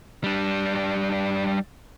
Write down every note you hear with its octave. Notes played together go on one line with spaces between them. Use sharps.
G3 D4